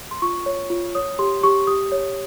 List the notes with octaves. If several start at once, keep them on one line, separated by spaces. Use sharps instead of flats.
C6
F4 C#6
C#5
F4
C#5 D#6
G4 C6
G4 C#6
G4 D#6
C#5